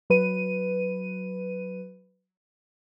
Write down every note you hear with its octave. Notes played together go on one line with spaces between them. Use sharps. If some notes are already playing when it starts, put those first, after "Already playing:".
F#3 B4 D#7